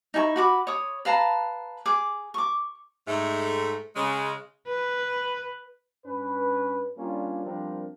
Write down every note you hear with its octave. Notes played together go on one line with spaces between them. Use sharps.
D#4 E4 G#5 C#6
F#4 B5 D6
C#5 D#6
B4 F5 A5 A#5
G#4 D6
C#6 D6
G#2 A3
C#3 G#3
B4
G2 C#4 B4
G3 A#3 C#4 D4 F4
F3 G3 C4 D4 A#4